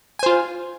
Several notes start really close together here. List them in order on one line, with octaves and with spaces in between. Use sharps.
G#5 C5 F4